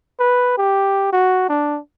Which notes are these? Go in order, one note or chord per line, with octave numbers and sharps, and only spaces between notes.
B4
G4
F#4
D4